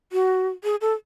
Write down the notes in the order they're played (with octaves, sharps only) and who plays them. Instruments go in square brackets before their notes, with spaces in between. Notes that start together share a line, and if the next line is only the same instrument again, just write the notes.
[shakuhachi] F#4
G#4
A4